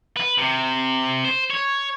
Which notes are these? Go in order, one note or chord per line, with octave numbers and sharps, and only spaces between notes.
B4
C3
C5
C#5